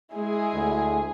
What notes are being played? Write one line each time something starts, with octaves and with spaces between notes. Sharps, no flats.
G#3 E4 G#4
D2